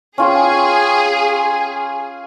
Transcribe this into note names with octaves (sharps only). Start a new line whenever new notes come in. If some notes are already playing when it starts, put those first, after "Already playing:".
C#4 F4 G#4 G5